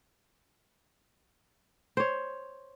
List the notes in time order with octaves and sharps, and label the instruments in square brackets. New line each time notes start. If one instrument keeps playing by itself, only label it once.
[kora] C5 C#5